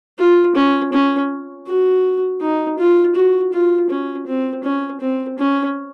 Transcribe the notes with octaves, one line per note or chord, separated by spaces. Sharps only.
F4
C#4
C#4
F#4
D#4
F4
F#4
F4
C#4
C4
C#4
C4
C#4